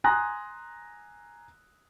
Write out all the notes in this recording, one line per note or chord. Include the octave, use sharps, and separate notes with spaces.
G#5 A#5 C6 D#6 F#6 A#6